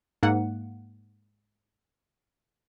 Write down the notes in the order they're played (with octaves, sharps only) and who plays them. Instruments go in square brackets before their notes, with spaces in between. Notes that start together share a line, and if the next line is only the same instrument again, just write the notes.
[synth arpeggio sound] G#2 A#3 F#5